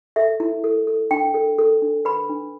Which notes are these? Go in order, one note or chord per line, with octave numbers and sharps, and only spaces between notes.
A4 E5
E4
A4
A4
D4 G5
A4
A4
D4
B4 B5
D4